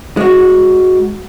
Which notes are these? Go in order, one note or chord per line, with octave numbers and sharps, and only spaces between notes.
G#3 F#4